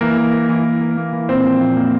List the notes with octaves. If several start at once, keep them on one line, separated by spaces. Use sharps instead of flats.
E3 A#3 A#4
A#3
A#3
E3
E3
A#3
A#3
E3
A#2 C4 C5
F3
A#2
A#3